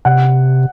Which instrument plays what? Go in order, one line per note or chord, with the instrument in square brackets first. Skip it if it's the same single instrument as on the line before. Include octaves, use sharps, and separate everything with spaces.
[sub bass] C3 [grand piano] F#5